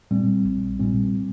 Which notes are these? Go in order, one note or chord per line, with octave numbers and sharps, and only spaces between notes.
A#2 G3 C4
A#1
A#2 G3 C4